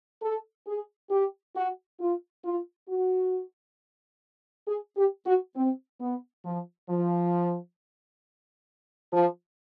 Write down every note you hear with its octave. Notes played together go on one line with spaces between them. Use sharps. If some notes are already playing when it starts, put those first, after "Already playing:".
A4
G#4
G4
F#4
F4
F4
F#4
G#4
G4
F#4
C4
B3
F3
F3
F3